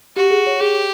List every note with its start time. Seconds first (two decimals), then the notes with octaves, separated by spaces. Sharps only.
0.16 F#4 G4
0.31 G#4
0.46 C#5
0.60 G4 G#4